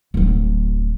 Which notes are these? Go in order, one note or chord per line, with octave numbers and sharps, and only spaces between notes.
D1 F#3